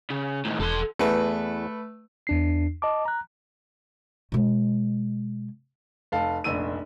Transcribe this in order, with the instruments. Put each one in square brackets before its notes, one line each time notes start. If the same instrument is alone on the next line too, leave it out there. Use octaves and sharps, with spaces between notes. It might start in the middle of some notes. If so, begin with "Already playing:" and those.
[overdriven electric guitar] C#3
A2 D#3
[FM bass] E1 [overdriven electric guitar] A4 C6
[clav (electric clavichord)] E2 [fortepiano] A3 B4
[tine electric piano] E2 D4 C7
D#5 A5 D6
A#5 F#6
[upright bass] B2 G#3
[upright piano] F1 A4 F5
F1 A#1 E6 D#7